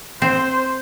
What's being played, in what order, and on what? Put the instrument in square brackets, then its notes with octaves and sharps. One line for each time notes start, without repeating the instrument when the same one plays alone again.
[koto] C4 [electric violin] C5